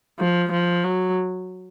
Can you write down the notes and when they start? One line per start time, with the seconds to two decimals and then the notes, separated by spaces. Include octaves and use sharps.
0.19 F3
0.51 F3
0.84 F#3